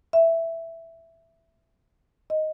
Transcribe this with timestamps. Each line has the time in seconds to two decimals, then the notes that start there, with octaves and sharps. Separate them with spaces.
0.13 E5
2.30 D#5